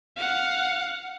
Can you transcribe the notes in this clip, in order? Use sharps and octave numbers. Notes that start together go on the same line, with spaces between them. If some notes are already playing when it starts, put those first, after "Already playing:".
F5 F#5